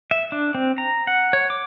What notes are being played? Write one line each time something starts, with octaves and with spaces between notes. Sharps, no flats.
E5
D4
C4
A#5
F#5
C#5
D6